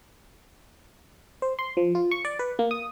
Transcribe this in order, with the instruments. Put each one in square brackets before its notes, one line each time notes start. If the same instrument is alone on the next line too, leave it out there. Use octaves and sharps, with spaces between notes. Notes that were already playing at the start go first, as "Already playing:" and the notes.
[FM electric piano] C5
C6
F3
F4
C#6
D5
B4
A#3
D#6